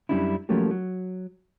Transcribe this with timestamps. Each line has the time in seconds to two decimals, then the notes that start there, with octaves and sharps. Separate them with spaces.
0.09 F#2 F3 G3 C#4 D4 E4
0.49 F3 F#3 A3 A#3 C#4 G4
0.71 F#3